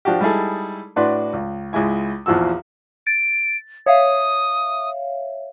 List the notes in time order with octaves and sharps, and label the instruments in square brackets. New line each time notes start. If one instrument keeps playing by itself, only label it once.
[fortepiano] F3 D4 F#4 G4
G3 G#3 D#4 E4 G#4 A4
A2 D4 F#4 B4 D5 C6
C#2
C#2 G#3 E4 G#5
A#1 E2 F3 F#4 E6
[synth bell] A6 [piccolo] D7
[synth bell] C#5 E5 F5 [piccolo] D#6